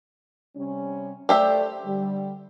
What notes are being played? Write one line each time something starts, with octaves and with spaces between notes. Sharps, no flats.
C3 G3 C#4
A3 G4 C5 D5 E5
D3 G3